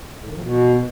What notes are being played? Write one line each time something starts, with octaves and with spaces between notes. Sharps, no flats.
A2
D#3
F3
B2